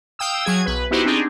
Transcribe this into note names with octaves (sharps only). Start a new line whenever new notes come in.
F5 G5 D#6 E6
F#3 G#4 G#6
B1 B4
B3 D#4 E4 F#4 G4 C5
C4 D4 D#4 G4 G#4